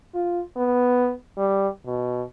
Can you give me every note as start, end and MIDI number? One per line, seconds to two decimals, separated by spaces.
0.14 0.41 65
0.57 1.12 59
1.37 1.68 55
1.86 2.22 47